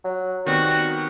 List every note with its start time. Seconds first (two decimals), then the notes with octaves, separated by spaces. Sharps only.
0.04 F#3
0.46 D#3 G3 B3 C4 F#4